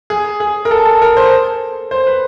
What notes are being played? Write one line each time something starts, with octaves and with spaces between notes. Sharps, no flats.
G#4
G#4
A#4
A4
A4
A#4
C5
C5
B4